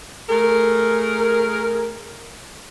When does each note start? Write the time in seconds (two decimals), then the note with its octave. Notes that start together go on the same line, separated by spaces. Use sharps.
0.29 A3 G#4 A#4